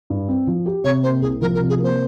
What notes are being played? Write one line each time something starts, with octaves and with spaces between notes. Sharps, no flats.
G2
C4
F3
G4
C3 C#5
A#3 C5
C2 G#4
F3 A#4
A#4
C3
G#4
A#3 C5